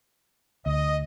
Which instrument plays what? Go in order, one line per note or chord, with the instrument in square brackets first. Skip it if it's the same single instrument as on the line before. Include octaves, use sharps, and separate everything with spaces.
[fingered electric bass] D2 [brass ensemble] D#5